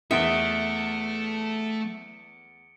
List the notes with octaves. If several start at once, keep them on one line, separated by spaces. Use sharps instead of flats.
E2 A3 E5 D#6 C#7 D7 G7